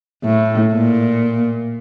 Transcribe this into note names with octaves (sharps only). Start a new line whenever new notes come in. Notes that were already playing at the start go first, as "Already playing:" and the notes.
A2
A#2